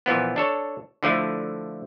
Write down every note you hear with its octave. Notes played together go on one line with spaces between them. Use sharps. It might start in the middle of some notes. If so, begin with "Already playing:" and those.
A#2 E3 F3 B3
D4 A4 C#5
D3 F3 A3 E4